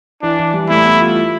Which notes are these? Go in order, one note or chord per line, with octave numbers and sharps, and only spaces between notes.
E3 D4
E3
G3
A3 E4
B3
F4
E4